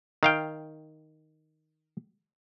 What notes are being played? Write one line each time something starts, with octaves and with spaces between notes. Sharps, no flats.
D#3 F5 G5